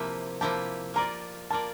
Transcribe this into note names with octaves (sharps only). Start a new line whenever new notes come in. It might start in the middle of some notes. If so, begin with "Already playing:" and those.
Already playing: C3 F3 A#3 E4 G4
C3 F3 A#3 E4 G4 A5
A#3 F4 A#4 D5 A#5
A#3 F4 A#4 D5 A5